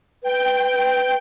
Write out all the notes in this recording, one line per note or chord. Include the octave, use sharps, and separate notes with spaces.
B4 G5